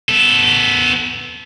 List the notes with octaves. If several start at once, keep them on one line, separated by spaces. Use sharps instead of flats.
B3 A4